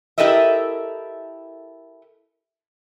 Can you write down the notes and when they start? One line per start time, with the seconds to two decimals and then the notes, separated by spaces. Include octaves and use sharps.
0.18 E4 G4 A4 A#4 D#5 E5